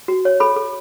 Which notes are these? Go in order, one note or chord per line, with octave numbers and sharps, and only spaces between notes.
F#4
C#5
A4 B5
A4